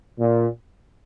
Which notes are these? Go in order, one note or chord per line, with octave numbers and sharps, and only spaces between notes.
A#2